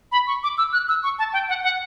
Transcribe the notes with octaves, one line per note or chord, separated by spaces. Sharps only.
B5
C#6
D6
E6
F#6
E6
C#6
A5
G5
F#5
F#5